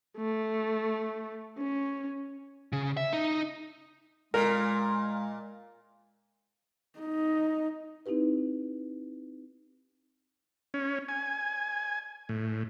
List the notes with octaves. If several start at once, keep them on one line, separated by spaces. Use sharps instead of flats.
A3
C#4
C#3
E5
D#4
A#2 G#3 A#4
D#4
C4 D#4 E4 G4 B4
C#4
G#5
A2